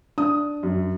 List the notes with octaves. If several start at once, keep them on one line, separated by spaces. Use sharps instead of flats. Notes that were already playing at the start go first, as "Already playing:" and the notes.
D4 D#6
F#2